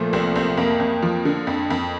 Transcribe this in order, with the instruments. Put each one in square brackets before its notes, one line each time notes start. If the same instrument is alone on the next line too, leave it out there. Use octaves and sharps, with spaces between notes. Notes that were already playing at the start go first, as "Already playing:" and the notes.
Already playing: [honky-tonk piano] A#2 [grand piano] F3 A3
[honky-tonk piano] C2 [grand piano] C4
[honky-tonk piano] C2 [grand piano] C4
[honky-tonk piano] F2 [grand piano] A#3
[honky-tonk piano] F2
F3
D3
F2
F2